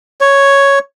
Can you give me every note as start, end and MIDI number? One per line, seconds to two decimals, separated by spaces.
0.21 0.79 73